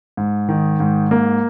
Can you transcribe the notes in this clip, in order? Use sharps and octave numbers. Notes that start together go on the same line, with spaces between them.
G#2
D#3
G#2
A#3